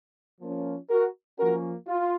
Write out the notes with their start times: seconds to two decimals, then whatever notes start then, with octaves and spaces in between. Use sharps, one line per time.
0.41 F3 A#3 C#4
0.89 F#4 A#4
1.38 F3 A#3 C#4 F#4 A#4
1.88 F4